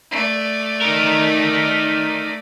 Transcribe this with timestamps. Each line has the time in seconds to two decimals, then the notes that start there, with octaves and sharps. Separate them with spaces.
0.11 A3 D5
0.82 D#4 A#4